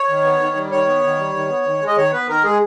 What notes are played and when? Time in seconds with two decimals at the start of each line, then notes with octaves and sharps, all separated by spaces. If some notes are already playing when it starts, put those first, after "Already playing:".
Already playing: C#5
0.08 D#3
0.24 B3
0.40 D#3
0.56 G3
0.71 D#3 C#5
0.87 B3
1.03 D#3
1.18 G3
1.35 D#3
1.49 B3
1.65 D#3
1.81 G#3
1.87 D#5
1.96 D#3 C#5
2.13 B3 B4
2.28 D#3 A#4
2.44 G#3 G#4